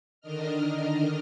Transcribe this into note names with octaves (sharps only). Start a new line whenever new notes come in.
D3 D#3 D4 A#4 D#5 F6